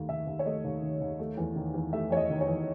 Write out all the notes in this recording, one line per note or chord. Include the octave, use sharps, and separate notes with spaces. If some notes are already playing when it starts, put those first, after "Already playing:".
Already playing: D#2 A3
D#3 E5
D#2
C#5
A3 D#5
D#2
D#3
D#2
A3
E2
D#3
E2
A3 E5
E2 C#5
D#5
D#3
C#5
E2